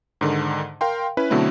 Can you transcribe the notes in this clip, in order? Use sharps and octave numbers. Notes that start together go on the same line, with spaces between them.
G#2 D3 D#3
A#4 F5 G5 C6
C#4 E4 B4
B2 D3 F#3 A3 C4 E4